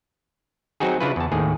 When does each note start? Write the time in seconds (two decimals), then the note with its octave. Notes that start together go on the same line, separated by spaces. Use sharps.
0.80 F#3 C4 D#4 F#4 G#4
1.00 C#3 D4 E4 F4 B4
1.16 E2 A5
1.32 D#2 A2 D#3 G#4